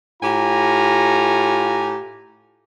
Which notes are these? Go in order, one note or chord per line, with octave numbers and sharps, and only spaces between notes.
A2 F4 G4 G#5 A#5